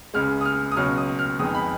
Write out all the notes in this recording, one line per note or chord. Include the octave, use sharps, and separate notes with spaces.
C#2 C#3 G#3 F6
D#6
F6
D#6
C#2 B2 F#3 C#4 F6
D#6
F6
F2 D#3 G#3 B3 D#6
B5